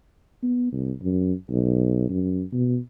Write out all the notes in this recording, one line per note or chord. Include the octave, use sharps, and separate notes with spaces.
B3
C2
F#2
B1
F#2
B2